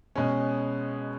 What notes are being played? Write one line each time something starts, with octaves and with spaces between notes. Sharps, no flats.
B2 G#3 C#4